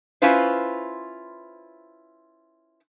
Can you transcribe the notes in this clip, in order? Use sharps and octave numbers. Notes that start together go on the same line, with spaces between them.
C#4 E4 F4 B4 C5